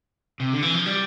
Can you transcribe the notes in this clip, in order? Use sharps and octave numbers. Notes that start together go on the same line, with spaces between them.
C3
D3
E3
F3
G3